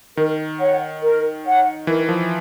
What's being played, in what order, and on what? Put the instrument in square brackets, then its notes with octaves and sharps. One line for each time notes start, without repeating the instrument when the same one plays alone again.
[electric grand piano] D#3 [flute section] A#4
[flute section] C#5 F#5
A#4
C#5 F#5
[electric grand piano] E3 [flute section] A#4
[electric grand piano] F3